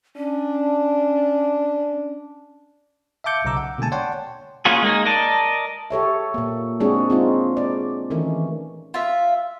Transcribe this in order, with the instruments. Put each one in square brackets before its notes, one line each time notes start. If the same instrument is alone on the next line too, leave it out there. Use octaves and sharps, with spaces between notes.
[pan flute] C#4 [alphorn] D4
[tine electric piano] E5 F5 A5 D6 G6 C#7
B1 C#3 D#5 A#5 D6 E6
F#5
B2 D3 G#3 A#3 G#5 A5
C#5 D5 F#5 G5 A5 C6
[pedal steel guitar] A#3 C#4 F4 F#4 G#4
G#3 A#3 D#4
A#4 D5 D#5 A5
[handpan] G4 A4 C#5 E5
A#2 A#3
G#3 C4 D4 F#4 G#4 C#5
C4 D#4 F4
D5
D#3 E3 A3 C#4 D#4
[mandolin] F4 E5